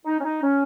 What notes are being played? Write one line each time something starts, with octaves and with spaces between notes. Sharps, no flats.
D#4
C#4
D#4
C#4